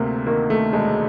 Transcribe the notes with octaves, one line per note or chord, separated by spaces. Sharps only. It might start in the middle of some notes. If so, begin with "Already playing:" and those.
Already playing: D2 C3 A3 A#3
D#3 A#3
A3
E1 G#3